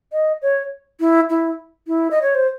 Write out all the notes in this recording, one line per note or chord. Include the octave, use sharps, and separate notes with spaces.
D#5
C#5
E4
E4
E4
D#5
C#5
C5